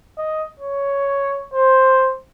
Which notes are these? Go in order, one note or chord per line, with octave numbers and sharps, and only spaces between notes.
D#5
C#5
C5